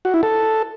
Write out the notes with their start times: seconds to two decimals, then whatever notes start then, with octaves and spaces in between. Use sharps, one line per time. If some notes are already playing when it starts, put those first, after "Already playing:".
0.05 F#4
0.14 E4
0.23 A4